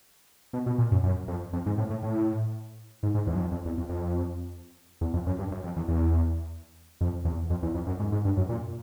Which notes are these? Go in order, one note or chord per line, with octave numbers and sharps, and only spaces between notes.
B2
B2
A#2
F#2
F#2
F2
F2
G#2
A2
A2
A2
G#2
G#2
E2
F#2
F2
F2
E2
F2
F2
E2
F2
F#2
G2
F#2
F2
E2
E2
F2
E2
F2
E2
F2
F#2
G#2
G#2
G2
F#2
A#2